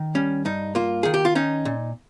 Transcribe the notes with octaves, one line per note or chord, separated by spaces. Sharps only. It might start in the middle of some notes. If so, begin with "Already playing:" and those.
Already playing: D#3
G3 C#4
G2 D#4
A#3 F4
D#3 G#4
G4
F4
C#4 D#4
A#2